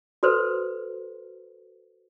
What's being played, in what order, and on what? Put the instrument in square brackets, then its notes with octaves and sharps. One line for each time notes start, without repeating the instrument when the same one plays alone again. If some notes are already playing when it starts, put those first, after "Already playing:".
[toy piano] F#4 A4 B4 C5